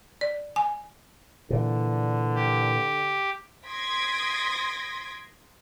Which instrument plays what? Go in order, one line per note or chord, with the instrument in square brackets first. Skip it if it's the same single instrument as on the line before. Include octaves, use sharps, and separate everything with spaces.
[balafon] D5
G#5
[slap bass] A#2 E3 [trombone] D3
[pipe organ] G4
[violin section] C6 D#6 G#6 A#6 B6 D7